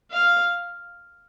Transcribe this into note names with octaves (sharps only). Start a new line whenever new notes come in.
F5